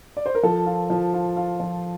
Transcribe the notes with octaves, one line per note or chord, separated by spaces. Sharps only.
D5
C5
A#4
F3 A4
F4
F3
F4
F4
F3